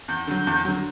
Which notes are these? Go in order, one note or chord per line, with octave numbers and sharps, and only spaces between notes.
E2 G6
D3 F#3
E2
D3 F#3